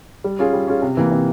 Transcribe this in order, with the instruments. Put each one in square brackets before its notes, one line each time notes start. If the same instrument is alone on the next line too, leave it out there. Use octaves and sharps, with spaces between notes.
[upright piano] G3
C#4 F4 G#4
G3
C#4 F4 G#4
C3
E3 A#3
C3